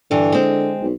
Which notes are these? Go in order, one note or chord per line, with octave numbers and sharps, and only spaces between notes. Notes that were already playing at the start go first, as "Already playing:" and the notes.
G2 D3 E3
G#3 C4
B1